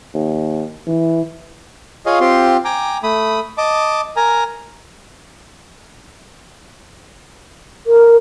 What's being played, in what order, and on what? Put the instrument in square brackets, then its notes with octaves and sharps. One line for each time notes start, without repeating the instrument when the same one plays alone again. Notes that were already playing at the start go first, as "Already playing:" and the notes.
[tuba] D#2
E3
[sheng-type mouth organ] F4 G#4 C#5 D#5 F5
C4 F4 G4 C6
G5 G#5 A#5 D6
A3 B5 D#6
D#5 A5 D6
A#4 G#5 A#5
[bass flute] A#4